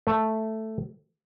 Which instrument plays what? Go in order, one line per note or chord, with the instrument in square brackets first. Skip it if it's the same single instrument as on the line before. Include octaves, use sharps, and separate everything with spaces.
[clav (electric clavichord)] A3